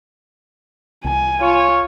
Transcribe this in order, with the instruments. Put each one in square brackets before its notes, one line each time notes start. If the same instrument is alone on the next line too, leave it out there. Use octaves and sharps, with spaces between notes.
[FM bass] C2 [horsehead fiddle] G#5
[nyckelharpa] F4 [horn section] C#5